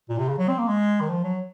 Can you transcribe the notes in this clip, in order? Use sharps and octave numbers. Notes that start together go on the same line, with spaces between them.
A#2
C3
C#3
F#3
C4
A#3
G#3
D#3
F3
F#3